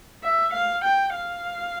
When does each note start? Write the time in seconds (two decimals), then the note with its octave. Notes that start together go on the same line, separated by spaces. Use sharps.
0.23 E5
0.54 F5
0.85 G5
1.15 F5